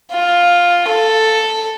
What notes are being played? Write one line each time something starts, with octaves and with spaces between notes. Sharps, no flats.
F4
A4